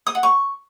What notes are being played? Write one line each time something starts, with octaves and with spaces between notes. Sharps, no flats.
D#6
F#5
C#6